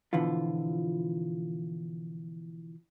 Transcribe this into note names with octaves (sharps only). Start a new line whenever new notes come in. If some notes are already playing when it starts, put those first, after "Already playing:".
B2 D3 E3 F3 F4